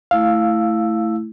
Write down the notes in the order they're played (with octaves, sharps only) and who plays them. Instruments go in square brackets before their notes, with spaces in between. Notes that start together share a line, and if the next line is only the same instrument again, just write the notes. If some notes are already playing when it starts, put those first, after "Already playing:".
[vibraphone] A3 E4 E6 [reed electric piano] F5